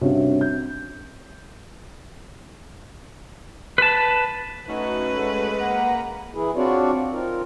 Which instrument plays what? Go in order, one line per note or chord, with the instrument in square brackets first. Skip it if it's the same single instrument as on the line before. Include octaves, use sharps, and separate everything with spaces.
[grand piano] G2 C3 C#4 F#4
G6
[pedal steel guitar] B4 A5
[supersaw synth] A3 C#4 F#4 [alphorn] D#4 [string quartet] B4
[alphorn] G#3 [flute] A4
[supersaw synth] A#3 A#5 [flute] F#5
[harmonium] E3 E4 G#4
C4 D4 F4 F#4 C#5 D5
C4 D#4 F4 A#4